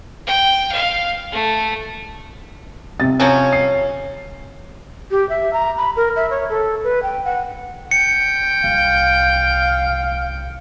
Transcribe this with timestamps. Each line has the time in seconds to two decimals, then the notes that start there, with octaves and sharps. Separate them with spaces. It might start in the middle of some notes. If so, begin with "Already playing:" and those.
0.27 G5
0.71 F5
1.32 A3
3.00 C3 A6
3.20 F3 F#3 C#4
3.53 C7
5.11 G4
5.29 E5
5.53 A#5
5.78 B5
5.96 A#4
6.16 E5
6.31 C#5
6.50 A4
6.84 B4
7.03 G5
7.25 F#5
7.91 G5 C#7
8.64 C2 F5